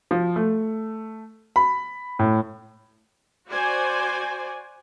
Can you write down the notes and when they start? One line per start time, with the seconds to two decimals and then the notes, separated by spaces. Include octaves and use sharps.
0.11 F3
0.36 A3
1.56 B5
2.19 A2
3.49 F#4 C5 D5 G#5